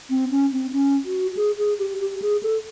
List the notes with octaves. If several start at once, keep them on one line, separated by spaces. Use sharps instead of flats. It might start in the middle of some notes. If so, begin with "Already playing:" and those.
C4
C#4
C4
C#4
F#4
G#4
G#4
G4
G4
G#4
A4